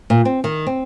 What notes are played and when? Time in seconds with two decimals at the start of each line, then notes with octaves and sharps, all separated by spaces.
0.10 A#2
0.25 C4
0.44 D#3
0.67 C4